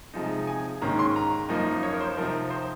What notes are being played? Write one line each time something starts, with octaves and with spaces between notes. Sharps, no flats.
C3 F3 G#3 D#4
G#5
G#2 D#3 A#3 C#4 A#5
C6
A#5
F#2 F3 A#3 D#4
C#5
A#4
C5
C3 F3 C4 D#4 A#4
C5